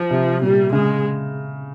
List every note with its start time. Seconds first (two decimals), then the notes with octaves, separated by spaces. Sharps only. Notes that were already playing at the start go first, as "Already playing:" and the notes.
Already playing: F3
0.10 C3
0.42 A#2 G3
0.72 C#3 G#3